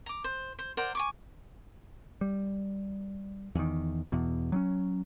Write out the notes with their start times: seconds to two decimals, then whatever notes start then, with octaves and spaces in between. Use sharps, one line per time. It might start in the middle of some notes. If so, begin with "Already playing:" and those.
0.06 A#5 D6
0.24 C5
0.59 C5
0.77 A#4 C5 D5 F#5
0.95 G#5 C#6 D6
2.21 G3
3.55 E2 D#3
4.12 E2 B2
4.52 F#3 C4 C#4